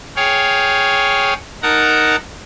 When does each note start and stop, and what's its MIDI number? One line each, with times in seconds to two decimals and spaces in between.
0.16 1.34 68
0.16 1.34 73
0.16 1.34 77
0.16 1.34 79
1.63 2.16 63
1.63 2.16 70
1.63 2.16 78
1.63 2.16 81
1.63 2.16 82